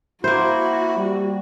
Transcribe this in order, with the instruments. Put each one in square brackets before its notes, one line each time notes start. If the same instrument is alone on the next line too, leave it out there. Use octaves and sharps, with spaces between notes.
[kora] A#3 C5 [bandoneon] E4 [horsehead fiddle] F#4
[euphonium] G3